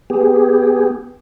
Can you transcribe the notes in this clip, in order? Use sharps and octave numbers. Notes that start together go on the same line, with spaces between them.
B3 G4 G#4